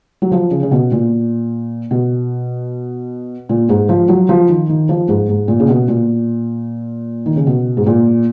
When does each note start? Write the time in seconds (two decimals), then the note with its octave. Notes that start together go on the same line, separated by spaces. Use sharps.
0.22 F#3
0.32 F3
0.51 C#3
0.63 C#3
0.71 B2
0.92 A#2
1.91 B2
3.49 A#2
3.69 G#2
3.89 F3
4.09 F#3
4.29 F3
4.49 D#3
4.69 D#3
4.89 F3
5.08 G#2
5.29 G#2
5.48 A#2
5.60 C#3
5.68 B2
5.88 A#2
7.26 D#3
7.36 C#3
7.47 B2
7.77 G#2
7.86 A#2